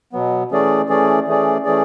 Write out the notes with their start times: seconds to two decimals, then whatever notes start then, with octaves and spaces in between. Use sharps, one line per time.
0.13 B2 F#3 B3
0.52 E3 A3 C#4 G#4 D5
0.89 E3 A3 C#4 G#4 D5
1.28 E3 A3 C#4 G#4 D5
1.65 E3 A3 C#4 G#4 D5